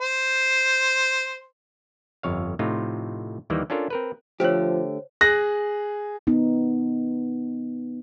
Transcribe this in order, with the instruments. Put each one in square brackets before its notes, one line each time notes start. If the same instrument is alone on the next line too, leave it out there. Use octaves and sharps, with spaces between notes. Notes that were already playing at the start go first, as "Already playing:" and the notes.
[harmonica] C5
[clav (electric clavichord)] G1 F2 C#5 F5
A2 C3 F3 D#4 F4
D#2 D#3 E3 G3 A#3
C#4 D4 F4 A4 A#4
C4 A#4 B4
[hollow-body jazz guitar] D3 A3 G4 [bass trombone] F3 [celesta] C5 C#5
[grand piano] G#4 F#6 A#6
[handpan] B3 D#4